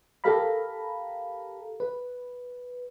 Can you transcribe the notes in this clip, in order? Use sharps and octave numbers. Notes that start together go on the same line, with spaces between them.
G4 A4 A#4 F5 A#5 B5
B4